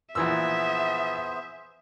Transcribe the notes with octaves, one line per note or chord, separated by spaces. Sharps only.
A#1 E3 B3 G#4 C5 E5 E6